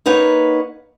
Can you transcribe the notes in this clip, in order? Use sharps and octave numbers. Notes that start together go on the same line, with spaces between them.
A#3 D#4 B4 C#5 F#5